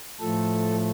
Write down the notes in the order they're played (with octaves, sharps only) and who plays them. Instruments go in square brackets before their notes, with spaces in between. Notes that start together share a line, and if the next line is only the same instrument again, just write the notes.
[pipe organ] A2 F3 A3 A4